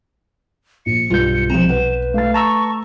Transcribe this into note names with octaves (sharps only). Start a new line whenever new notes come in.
A#1 C#7
B1 G2 G3 F4 G6
C2 F3 A#5 E7
B4 F#5
A3 F5 A6
A5 A#5 C#6 E6